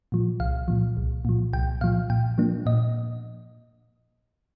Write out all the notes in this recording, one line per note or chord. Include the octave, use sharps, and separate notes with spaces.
A#2 F3
C2 F5
A#2 F3
C2
A#2 F3
C2 G5
A#2 F3 F5
A#2 G5
F3 A#3 D4
A#2 D#5